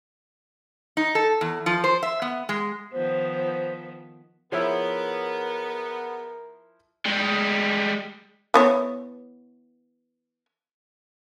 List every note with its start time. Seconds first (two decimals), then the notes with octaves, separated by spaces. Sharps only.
0.97 D#4
1.15 A4
1.41 E2
1.66 F3
1.84 C5
2.03 E5
2.22 B3
2.49 G#3
2.93 D#3 F3 B3 C5
4.52 F3 B3 E4 G#4 A#4 C#5 E5
7.05 G3 G#3
8.54 E3 B3 C#5